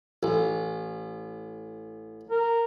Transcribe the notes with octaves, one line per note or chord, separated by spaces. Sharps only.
A1
A#4